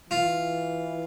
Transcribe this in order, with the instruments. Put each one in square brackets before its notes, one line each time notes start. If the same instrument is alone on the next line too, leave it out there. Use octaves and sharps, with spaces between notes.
[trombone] E3 [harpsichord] F4